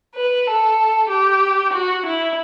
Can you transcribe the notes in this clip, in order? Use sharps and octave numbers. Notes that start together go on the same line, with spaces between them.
B4
A4
G4
F#4
E4